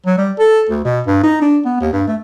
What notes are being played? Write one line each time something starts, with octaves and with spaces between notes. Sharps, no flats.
F#3
G3
A4
D2
B2
G2
D#4
D4
B3
D#2
G2
A3